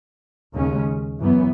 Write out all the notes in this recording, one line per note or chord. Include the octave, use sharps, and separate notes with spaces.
D#2 C#3 G#3 C#4
F#2 E3 B3